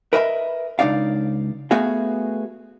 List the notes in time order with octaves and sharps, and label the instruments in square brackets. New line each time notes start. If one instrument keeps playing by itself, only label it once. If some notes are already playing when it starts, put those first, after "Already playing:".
[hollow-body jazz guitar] A#4 B4 D#5 E5 G5 B5
C#2 G2 D4 D#4 D5 F5
A3 B3 F#4 G#4 F5